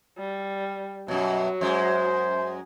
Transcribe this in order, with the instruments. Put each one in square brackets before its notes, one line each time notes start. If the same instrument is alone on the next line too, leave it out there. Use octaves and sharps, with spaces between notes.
[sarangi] G3
[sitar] F#2 B2 [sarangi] F#3
[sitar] F#2 G#3 [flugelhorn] C5